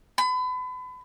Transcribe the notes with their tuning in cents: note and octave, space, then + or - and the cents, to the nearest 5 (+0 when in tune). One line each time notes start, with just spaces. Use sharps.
B5 +35